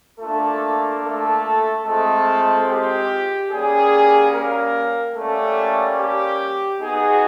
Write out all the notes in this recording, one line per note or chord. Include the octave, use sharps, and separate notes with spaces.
A3 A#3 D4 F4 A4
A3 A4
G#3 A3 C4 F4 A4
G4
G3 A#3 C#4 G#4
A#3 A#4
G3 A3 A#3 C#4 A4
G4
B3 D#4 F#4 G#4